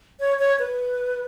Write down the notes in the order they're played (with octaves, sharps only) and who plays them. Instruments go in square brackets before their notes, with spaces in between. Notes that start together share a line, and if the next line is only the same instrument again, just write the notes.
[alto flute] C#5
C#5
B4